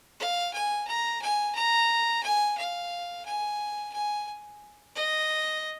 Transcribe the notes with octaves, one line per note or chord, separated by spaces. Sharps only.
F5
G#5
A#5
G#5
A#5
G#5
F5
G#5
G#5
D#5